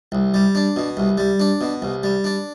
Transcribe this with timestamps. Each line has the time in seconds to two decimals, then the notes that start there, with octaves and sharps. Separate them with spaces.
0.12 C2
0.34 G3
0.55 D4
0.76 B2
0.97 C2
1.18 G3
1.40 D4
1.61 B2
1.82 C2
2.03 G3
2.24 D4